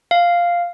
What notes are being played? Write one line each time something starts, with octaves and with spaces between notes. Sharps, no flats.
F5